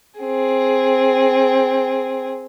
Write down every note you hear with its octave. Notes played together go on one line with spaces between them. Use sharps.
C4 G#4